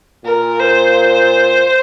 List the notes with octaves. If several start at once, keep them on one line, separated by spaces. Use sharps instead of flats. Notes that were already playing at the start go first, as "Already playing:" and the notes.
A#2 A#4
C5